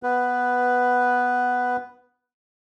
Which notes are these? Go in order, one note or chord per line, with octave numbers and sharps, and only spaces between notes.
B3 B4